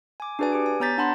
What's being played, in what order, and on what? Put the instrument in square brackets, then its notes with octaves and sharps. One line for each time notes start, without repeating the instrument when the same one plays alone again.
[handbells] G#5 D6
D4 F#4 G#4 B4 D5 G#5
G4 G#5 D7
G#5
B3 C#5 A#5 G6 A6 B6
D4 F#5 A5 B5 C6 A#6